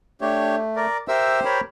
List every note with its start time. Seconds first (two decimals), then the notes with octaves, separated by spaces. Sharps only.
0.21 A3 D4 G4 C#5
0.76 A#4 D5
1.08 G4 A#4 C5 E5 E6
1.45 A#4 C#5 B5